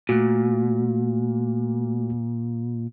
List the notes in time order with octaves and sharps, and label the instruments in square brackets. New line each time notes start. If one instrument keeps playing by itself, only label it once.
[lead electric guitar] A#2 [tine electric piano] A3 F#4